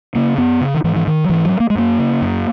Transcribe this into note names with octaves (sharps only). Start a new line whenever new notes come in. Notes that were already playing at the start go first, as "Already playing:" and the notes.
C#3 A#3
F#2 B3
C#3
D#3
G#2 E3
E3
D#3
F#3
G#2 E3
F#3
A#3
G#3
F#2 A#3
C#3
F#2